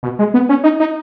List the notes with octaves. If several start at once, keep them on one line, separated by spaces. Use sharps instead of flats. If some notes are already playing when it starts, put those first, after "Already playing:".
B2
G#3
B3
C#4
D#4
D#4